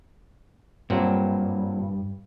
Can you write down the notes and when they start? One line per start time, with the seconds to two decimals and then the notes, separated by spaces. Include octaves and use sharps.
0.90 G2 A#2 F#3 C4